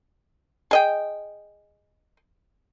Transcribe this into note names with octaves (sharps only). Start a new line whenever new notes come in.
G#4 D#5 G5